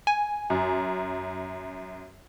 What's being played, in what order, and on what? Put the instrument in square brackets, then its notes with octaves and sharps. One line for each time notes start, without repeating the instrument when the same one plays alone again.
[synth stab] G#5
[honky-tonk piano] F#2